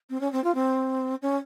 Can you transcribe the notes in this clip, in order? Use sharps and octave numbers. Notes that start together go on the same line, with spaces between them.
C4
C#4
C4
F4
C4
C#4